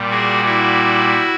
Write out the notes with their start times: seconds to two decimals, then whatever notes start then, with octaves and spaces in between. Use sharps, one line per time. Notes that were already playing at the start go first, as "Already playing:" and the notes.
Already playing: A#2 G3
0.10 F#4 G#4
0.45 E4 F#4